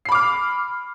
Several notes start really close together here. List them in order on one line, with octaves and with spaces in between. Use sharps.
C7 B5 D6 F6